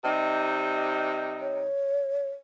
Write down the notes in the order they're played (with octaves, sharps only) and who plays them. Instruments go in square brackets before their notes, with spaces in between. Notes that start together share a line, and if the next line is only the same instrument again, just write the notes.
[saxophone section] C3 G3 D#4
[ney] C#5